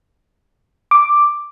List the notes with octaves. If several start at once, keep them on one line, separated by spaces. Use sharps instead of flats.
D6